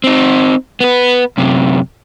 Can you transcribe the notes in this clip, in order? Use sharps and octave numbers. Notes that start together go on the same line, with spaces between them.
C4 D#4
B3 B4
F#2 C3